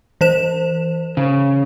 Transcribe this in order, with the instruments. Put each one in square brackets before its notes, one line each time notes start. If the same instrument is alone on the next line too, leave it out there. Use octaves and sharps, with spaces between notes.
[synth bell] E3 C5 E7
[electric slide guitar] C#3